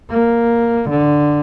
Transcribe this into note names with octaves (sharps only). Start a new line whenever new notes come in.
A#3
D3